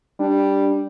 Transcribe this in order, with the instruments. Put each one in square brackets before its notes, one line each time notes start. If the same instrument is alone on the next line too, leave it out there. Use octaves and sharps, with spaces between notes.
[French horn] G3 [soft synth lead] D4